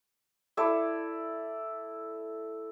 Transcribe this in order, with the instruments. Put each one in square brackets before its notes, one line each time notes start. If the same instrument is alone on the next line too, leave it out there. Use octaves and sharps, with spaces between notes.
[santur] E4 A4 D5